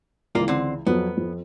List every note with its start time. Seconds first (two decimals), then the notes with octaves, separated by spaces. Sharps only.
0.35 C#2 E3 A#3 F4 D5
0.48 D3 C4
0.87 F2 F#3 B3
1.17 F2